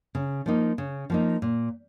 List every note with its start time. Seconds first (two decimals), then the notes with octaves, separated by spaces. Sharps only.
0.15 C#3
0.46 F3 A#3 D#4
0.78 C#3
1.10 F3 A#3 D#4
1.42 A#2